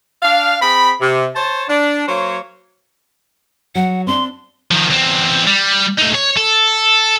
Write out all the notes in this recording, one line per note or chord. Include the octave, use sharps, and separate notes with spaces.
D4 F5
C4 G#4 B5
C3
C5 C#5 A5
D4
F#3 A#3 C5 C#5
F#3 F#5
C4 D4 C6
D#3 F3
E2 C4
G3
A3 D#4
C#5
A4